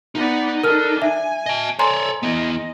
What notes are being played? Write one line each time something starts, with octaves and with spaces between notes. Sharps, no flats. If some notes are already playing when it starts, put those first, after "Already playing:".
B3 D#4 D5
D4 A4 A#4 F6
E5 G#5
D#5 A5
A4 C#5 D5 G#5 A#5 C6
B3 E4 D#5